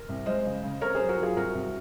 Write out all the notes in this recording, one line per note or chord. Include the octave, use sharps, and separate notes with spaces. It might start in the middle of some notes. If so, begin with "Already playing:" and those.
Already playing: A#4
C2
G#3 C5 D#5
C#3
C#3
C4 A#4 C#5
F#3 G#4 C5
F#4 A#4
F#3
F4 G#4
C2 F#4 A#4
C2